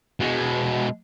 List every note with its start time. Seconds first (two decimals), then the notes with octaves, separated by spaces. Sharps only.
0.20 B2 G#3